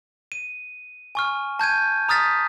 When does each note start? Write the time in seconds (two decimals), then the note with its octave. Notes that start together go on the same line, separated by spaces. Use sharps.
0.32 D#7
1.15 G#5 C#6 F6
1.59 A5 G6 G#6 D#7
2.09 A#5 D#6 F6 A6 B6